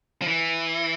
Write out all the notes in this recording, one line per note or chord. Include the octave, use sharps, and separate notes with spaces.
F3
E3